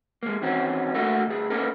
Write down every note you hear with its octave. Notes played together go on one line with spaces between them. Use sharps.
G#3 A#3
E2 D#3 C4 C#4 F#4
D3 A3 A#3 F#4 A4 A#4
D2 G#4
A#3 B3 C#4 A4 A#4